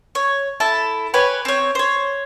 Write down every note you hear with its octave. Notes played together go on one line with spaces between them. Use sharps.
C#5
E4 A4 A5
G4 B4 C#5 G#5
C4 C#5
C5 C#5